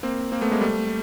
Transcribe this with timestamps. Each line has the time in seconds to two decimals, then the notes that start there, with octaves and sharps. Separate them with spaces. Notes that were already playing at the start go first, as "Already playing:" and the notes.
0.03 A#3 C4
0.32 A#3 C4
0.41 A3 B3
0.51 G#3 A#3
0.61 G3 A3